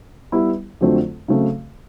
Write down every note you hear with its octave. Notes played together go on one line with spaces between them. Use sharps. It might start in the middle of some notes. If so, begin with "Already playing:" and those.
G3 B3 E4
F2 D3 F#3 A3 C4
C#3 F#3 A3 C4